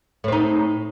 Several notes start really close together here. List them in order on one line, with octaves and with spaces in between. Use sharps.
A2 C4 D#4